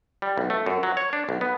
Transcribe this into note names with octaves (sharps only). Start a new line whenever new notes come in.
G3
B1
A3
F#2
F#3
C#5
D4
B1
B3